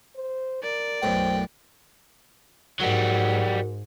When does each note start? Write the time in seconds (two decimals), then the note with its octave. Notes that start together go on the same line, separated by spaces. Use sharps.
0.16 C5
0.63 A#4 D5
1.03 B1 F#2 A2 C5 G5
2.80 G#2 F#3 G3 F#4 A#4 F#5